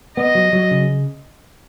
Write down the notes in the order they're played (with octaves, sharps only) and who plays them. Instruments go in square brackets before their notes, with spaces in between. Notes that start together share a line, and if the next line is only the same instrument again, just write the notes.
[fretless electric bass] B3 [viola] D#5
[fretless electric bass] F#3
F#3
C#3